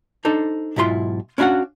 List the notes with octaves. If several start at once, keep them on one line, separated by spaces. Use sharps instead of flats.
D4 D#4 A4 C5
B1 G#2 E4 F4 C6
C#4 D4 E4 F#4 F5 F#5